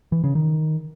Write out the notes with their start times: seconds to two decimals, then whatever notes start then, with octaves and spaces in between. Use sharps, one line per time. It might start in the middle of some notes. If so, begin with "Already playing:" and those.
0.12 E3
0.24 C#3
0.35 D#3